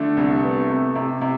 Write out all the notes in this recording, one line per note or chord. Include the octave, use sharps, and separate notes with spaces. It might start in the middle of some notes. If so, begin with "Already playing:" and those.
Already playing: D3 A3 A4
C2
B3
C3
C3
C3